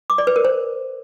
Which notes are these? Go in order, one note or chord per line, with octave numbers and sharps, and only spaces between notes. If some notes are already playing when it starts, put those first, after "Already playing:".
D6
D5
B4
A#4
C5